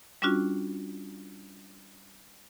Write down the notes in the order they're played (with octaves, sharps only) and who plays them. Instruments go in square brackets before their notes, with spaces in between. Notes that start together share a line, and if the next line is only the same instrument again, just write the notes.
[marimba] G3 C#4 D4 F4 F#4